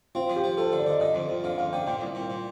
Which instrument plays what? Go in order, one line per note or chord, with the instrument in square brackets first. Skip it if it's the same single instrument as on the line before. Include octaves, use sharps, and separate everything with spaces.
[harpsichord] C4 [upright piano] F4
[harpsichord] F3
[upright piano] G4
[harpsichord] F3
[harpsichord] F3 [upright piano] A4
[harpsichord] D3
[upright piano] D5
[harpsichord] D3 [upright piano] D#5
[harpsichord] D3 [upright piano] D#5
[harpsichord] F2
F2
[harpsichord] D3 [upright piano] F5
[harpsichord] F2 [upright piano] F5
[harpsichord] D3 [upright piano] G5
[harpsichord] A#2 [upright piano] G5
[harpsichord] C2
A#2
A#2